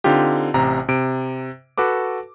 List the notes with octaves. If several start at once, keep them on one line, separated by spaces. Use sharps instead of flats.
D3 C4 D#4 F4 G4
A1 C3 A#5
C3 D7
F#4 A4 B4 D6